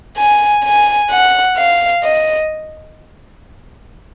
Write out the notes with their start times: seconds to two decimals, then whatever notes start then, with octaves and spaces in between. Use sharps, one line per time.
0.17 G#5
0.64 G#5
1.10 F#5
1.57 F5
2.03 D#5